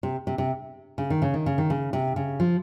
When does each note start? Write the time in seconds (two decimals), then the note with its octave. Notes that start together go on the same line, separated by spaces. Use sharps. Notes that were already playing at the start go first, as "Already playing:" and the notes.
0.03 C3
0.27 C3
0.38 C3
0.98 C#3
1.10 D#3
1.22 C#3
1.34 D#3
1.46 C#3
1.58 D#3
1.70 C#3
1.93 C3
2.16 C#3
2.40 F3